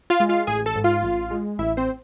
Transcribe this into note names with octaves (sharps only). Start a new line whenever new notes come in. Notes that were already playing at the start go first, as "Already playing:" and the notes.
F4 F5
G#3
F4 F5
A1 G#4 G#5
A4 A5
G#2
F4 F5
A1
G#3
A1 E4 E5
C4 C5